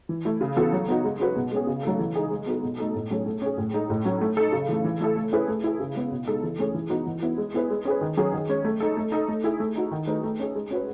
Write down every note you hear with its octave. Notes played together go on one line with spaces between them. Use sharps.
E3
A3 E4
C#3
E3 B3 F#4 A4
F#3
B3 D#4 F#4
G#3
C#4 F#4 B4
B2
G#3 C#4 G#4
C#3
F#3 A3 D#4 A4
E3
G#3 D#4 G#4
G#3
B3 D#4 F#4 A4
B2
A3 D#4 A4
A2
F#3 A3 C#4 G#4
A3
C#4 G#4
A2
G#3 D#4 A4
A2
F#3 C#4
A3
D#4 A4
C#3
E3 A3
E3
A3 E4 A4
A3
C#4 E4 G#4 B4
A3
E4 G#4
C#3
G#3 B3
B2
G#3 D#4 A4
E3
A3 C#4 G#4
E3
B3 D#4 F#4
E3
B3 E4
G#3
B3 E4 G#4 B4
G#3
C#4 G#4 B4
D#3
F#3 C#4 G#4
D#3
G#3 C#4
A3
D#4 A4
A3
D#4 A4
A3
E4 G#4
A3
D#4 F#4
D#3
A3 D#4 G#4 B4
A3
C#4 G#4
G#3
C#4 F#4 B4